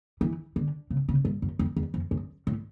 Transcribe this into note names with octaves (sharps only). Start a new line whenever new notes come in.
E3
D3
C#3
C#3
G2
F#2
F2
E2
F2
F#2
A2